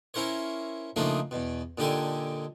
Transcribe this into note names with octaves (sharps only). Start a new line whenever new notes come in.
C#4 E4 A#4 C5 C#5
C#3 F3 A3 A#3 D4 D#4
E2 B2
A#2 D3 D#4 G4 A4 G#5